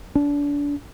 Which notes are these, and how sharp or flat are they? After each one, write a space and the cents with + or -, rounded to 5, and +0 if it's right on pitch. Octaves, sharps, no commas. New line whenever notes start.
D4 -30